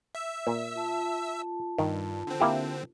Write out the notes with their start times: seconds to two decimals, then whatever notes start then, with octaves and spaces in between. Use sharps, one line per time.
0.15 E5 E6
0.47 A#2
0.76 F4 A5
1.78 G2 D#3
2.27 D3 C4
2.40 A#3 E4 G4